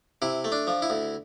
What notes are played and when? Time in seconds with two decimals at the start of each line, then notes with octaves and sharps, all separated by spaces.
0.22 C3 E4
0.44 A3
0.52 D4
0.67 F3
0.82 E4
0.90 D2